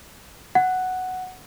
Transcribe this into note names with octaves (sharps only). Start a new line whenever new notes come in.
F#5